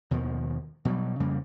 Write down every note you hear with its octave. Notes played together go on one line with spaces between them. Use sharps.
D#2 B2 D#3 F3
B2 F#3 G3
F2 C#3 G3 A#3